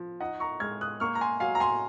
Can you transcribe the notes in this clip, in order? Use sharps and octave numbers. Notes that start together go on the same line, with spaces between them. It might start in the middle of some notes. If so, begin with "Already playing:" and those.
Already playing: F3
D#4 D#5 F#5
A#5 C#6
G#3 F6 G#6
D#6 F#6
A#3 C#6 F6
A#5
G#5 C6
F#3 F5 G#5
A#5
G#5 C6